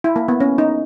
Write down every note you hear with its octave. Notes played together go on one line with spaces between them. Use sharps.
E4
A#3
B3
C#4
D#4